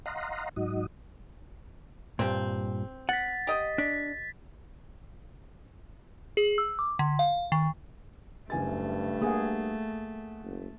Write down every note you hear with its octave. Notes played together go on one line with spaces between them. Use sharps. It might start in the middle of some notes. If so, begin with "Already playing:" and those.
D#5 F5 F#5 A#5 C6
G#2 F#3 D#4 F#4 D#5
G2 A#2 C4
F#5 A6 B6
G4 D#5
D4 B6
G#4
E6
D6
D3
F5
D#3
F#1 G2 A3 G#5 A6
A#3 G#4 F#5 G#5 D#6
F#1